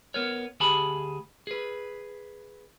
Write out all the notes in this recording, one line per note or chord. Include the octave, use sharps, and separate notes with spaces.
B3 A#4 C#5
D2 G4 G#4 G#5 A5 B5
G#4 B4